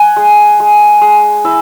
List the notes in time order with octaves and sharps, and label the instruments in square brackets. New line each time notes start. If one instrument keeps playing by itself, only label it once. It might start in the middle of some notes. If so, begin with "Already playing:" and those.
Already playing: [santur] F#5 G#5
G#3
G#3
G#3
E4 E5